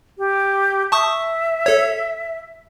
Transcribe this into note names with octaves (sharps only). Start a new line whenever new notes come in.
G4
E5 A5 C#6 D#6
A4 C#5